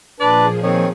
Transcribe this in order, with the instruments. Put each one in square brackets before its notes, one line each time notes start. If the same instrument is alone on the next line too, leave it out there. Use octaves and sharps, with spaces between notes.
[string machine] A#2 F3 G#4 [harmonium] D4 B4 [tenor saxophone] D5
[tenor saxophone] D#3 [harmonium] C4 C#5